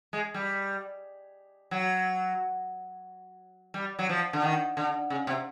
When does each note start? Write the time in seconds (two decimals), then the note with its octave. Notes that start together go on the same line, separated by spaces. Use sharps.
0.13 G#3
0.34 G3
1.71 F#3
3.74 G3
3.99 F#3
4.09 F3
4.33 D3
4.43 D#3
4.77 D3
5.10 C#3
5.27 C3